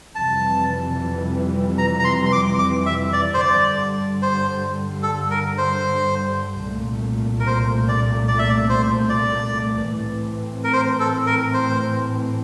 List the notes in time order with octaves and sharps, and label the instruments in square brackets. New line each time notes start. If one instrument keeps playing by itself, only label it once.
[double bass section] F2 C3 E3 G3 [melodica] A5
[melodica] A#5
A#5
C6
C6
D6
D6
E5
D5
C5
[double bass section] G2 D3 G3 [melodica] D5
[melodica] C5
A4
A#4
C5
[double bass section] C2 A#2 A3
[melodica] A#4
C5
D5
D5
E5
D5
C5
D5
[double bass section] A2 E3 A3 C4
[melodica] A#4
C5
A4
A#4
C5